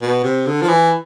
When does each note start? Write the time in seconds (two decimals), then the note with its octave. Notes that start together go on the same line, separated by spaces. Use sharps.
0.02 B2
0.24 C3
0.47 D3
0.62 F3
0.68 E3